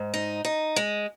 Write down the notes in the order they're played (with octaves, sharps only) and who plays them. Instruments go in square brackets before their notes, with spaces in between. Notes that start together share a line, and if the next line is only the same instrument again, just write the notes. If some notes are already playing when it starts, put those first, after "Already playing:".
Already playing: [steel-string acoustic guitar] G#2
D#4
D#4
G#3